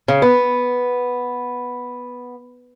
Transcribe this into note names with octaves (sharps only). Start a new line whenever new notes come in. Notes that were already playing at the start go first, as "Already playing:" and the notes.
C#3
B3